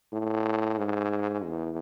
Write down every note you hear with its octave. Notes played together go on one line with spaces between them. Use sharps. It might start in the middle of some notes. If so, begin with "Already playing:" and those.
A2
G#2
E2